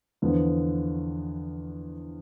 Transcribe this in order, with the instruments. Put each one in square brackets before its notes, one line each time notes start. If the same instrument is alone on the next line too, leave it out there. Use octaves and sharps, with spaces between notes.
[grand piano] E2 D3 F3 B3